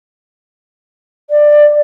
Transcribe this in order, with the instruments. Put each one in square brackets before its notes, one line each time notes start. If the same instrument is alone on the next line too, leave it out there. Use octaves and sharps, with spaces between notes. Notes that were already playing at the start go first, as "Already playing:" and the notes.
[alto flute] D5